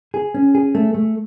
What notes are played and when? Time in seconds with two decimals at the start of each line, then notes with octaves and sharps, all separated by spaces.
0.14 G#4
0.34 C#4
0.55 G#4
0.75 A3
0.95 A3